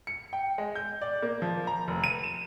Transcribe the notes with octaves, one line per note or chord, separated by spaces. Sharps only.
C#7
G5
G#3
G6
D5
A#3
F3
A#5
F1
D#7
E7